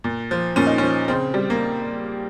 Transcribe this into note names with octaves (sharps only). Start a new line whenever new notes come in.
A#2
F3
A#2 C#4
D#4
F3 C#4
C#3 C4
G3
A#3